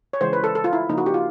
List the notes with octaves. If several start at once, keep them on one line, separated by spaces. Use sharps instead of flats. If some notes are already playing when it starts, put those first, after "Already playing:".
C#5
C#3 E3 G#3 C5
B4
A4
A4
F4
E4
C#3 F3 A#3 D#4
F#4
G4
F4